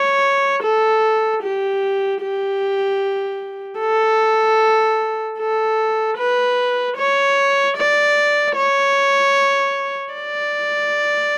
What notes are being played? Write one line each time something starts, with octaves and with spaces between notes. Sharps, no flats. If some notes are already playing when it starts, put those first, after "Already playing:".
Already playing: C#5
A4
G4
G4
A4
A4
B4
C#5
D5
C#5
D5